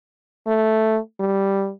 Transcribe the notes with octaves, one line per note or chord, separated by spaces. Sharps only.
A3
G3